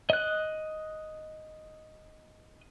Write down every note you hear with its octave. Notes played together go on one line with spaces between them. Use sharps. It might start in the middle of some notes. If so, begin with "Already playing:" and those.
D#5 F#6